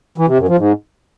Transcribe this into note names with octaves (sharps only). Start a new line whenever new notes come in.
E3
C3
F#2
F3
G#2